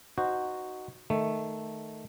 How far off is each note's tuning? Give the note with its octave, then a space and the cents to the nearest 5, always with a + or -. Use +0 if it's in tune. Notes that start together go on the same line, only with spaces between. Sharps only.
D#4 -15 F#4 +0 C5 +0
D#3 -5 A3 +0